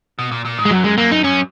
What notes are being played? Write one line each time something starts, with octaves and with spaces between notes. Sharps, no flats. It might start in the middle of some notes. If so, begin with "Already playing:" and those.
B2
A#2
A#2
G#2
G#3
F#2 F#3
G#3
F#2 A#3
D#4
F#2 C#4